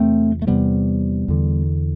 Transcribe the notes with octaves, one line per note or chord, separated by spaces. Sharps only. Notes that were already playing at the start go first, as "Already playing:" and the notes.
Already playing: E2 C3 A3 C4
A3
E2 C3 G3 B3
E2 D3